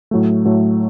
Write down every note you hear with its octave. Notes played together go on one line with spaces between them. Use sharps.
A2 F#3 A3
A2 F#3 A3